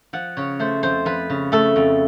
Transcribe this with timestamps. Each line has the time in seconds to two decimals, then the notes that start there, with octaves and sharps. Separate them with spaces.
0.13 F3 F#5
0.37 C#3 C#5
0.59 A3 C5
0.83 F2 C5
1.05 F3 B4
1.30 C#3
1.52 A3 A4
1.76 F2